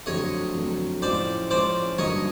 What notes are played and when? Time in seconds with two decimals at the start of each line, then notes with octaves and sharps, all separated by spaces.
0.06 F2 D3 F#3 A3 C4 C#5 D#5
0.55 F2 D3 F#3 A3 C4
1.02 A2 F3 G#3 C#4 C5 D5
1.50 A2 F3 G#3 C#4 C5 D5
1.98 G2 D3 F#3 A#3 D#4 C#5 D#5